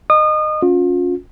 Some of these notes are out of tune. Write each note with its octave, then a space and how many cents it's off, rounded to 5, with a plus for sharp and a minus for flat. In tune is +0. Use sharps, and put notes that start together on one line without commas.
D#5 -20 D#6 -30
C#4 +5 F4 +35